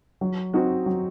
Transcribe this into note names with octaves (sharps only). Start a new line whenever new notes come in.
F#3
C4 D#4 F#4
F#3